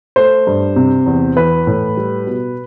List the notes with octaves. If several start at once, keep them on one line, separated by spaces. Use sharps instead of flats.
A3 C5
G2
C3
E2
E3 B4
A2
G3
B2